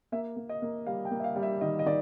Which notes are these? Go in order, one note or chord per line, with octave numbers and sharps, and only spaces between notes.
A#3 E5
A#3
D#5
A#3
G3 F5
G5
A#3
E5
F5
G3
E5
D#3 D#5
D#5
D#3 D5